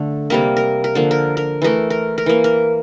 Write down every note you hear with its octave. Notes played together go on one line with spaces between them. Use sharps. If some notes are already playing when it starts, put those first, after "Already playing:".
Already playing: D3 A3
C3 G3 A#3 A#4
A#4
A#4
D3 F3 A#3
A#4
A#4
E3 A3 A#4
A#4
A#4
E3 A#3
A#4